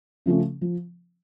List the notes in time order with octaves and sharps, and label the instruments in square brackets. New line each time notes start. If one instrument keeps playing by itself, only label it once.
[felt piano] C#3 F3 A3 C#4
F3